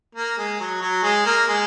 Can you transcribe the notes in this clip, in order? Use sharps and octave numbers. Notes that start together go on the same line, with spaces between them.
A#3
G#3
F#3
F#3
G#3
A#3
G#3